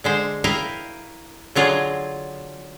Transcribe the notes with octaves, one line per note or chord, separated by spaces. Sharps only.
D3 G#3 C5
E4 A#4 D#5 F5 G5
D3 F#3 F4 G#4